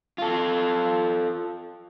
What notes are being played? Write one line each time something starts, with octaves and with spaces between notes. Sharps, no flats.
F4 A4